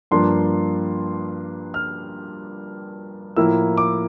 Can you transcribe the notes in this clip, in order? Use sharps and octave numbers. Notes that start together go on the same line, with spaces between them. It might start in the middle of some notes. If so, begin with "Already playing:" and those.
G2 F3 A#3 D4 C6
F6
A2 F3 A#3 E4 E6
D6